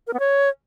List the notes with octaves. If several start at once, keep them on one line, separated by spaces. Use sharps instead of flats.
A#4
B3
C#5